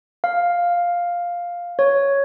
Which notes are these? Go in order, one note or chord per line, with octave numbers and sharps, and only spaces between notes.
F5
C#5